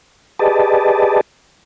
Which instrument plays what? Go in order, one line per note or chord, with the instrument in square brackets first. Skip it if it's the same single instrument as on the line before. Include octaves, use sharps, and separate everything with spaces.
[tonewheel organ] G4 G#4 B4 D5 D#5 A5